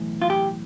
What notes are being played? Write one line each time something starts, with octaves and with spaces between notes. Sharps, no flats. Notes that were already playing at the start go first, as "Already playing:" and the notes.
Already playing: B1 A2 E3
F4
G4